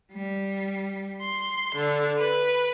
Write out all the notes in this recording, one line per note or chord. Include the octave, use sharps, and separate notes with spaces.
G3
C6
D3
B4